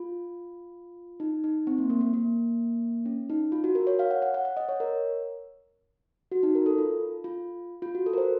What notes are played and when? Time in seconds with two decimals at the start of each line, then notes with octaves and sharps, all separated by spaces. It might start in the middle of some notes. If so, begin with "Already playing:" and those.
Already playing: F4
1.20 D#4
1.44 D#4
1.67 C4
1.78 A#3
1.90 A#3
2.01 A#3
2.13 A#3
3.06 C#4
3.30 D#4
3.52 F4
3.64 F#4
3.75 A#4
3.87 C#5
3.99 F5
4.11 F#5
4.22 F#5
4.34 F#5
4.45 F#5
4.57 D#5
4.69 C#5
4.80 A#4
6.32 F#4
6.43 D#4
6.55 A#4
6.66 A4
6.78 F4
7.24 F4
7.82 F4
7.95 F#4
8.06 A4
8.13 A#4
8.18 C5